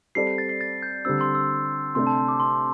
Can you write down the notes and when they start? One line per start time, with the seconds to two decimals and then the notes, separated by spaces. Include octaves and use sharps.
0.15 G3 C4 A4 D5 C7
0.27 C7
0.38 A6
0.49 C7
0.61 A6
0.83 G6
1.05 D3 G3 C4 E6
1.21 C6
1.35 E6
1.95 C3 A3 D4 C6
2.07 A5
2.18 C6
2.28 D6
2.40 C6